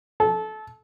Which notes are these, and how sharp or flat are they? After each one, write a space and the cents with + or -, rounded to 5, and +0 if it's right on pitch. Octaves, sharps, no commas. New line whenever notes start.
A4 -25